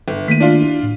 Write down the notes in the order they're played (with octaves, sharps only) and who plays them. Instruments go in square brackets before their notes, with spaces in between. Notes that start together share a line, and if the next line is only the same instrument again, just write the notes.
[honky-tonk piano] G1
[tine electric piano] D#3 A3 A#3 [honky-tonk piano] B6 D#7
[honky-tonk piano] D4 F4
[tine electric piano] E4 F#4
A2